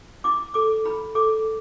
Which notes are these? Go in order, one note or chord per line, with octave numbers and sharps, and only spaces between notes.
E4 D6
A4 D6
E4 B5
A4 D6